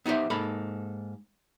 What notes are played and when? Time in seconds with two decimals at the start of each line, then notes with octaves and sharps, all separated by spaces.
0.06 B3 D#4 G4 C5 E5
0.30 G#2 A#3 A4 B5